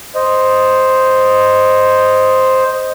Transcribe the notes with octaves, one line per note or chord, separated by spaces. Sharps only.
C5 D#5